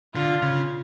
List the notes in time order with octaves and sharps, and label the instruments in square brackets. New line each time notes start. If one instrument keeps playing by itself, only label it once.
[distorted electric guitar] D3 [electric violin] F4
[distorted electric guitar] C#3